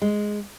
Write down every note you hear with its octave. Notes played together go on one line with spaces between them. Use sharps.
G#3